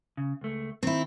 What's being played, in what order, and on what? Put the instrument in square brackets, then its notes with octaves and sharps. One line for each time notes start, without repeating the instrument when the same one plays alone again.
[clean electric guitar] C#3
C#2 A3
[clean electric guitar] D#3 [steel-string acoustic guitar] C4 E4